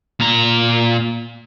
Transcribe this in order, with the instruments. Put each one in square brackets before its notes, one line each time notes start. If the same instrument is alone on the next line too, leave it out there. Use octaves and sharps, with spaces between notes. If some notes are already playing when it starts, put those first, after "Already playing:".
[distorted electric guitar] A#2 A#5